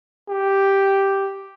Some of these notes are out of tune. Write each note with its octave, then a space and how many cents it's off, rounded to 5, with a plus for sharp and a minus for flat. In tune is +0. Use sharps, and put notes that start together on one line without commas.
G4 +0